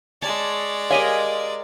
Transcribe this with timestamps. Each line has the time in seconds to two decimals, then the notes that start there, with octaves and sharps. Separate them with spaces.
0.22 G#3 C#5 D5 A5
0.90 G4 A#4 C#5 D#5 F5 G#5